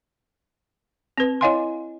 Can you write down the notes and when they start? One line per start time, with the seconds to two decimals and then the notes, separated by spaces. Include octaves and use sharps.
1.18 C4 B4
1.41 E4 C#5 D#5 F5 G#5 C6